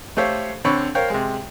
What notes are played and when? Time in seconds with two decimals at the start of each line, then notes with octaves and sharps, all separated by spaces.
0.17 A3 G4 A4 C5 C#5 F5
0.65 D3 C4 C#5 B5 C#6
0.95 A#4 C5 C#5 F5 G5
1.10 C3 G#3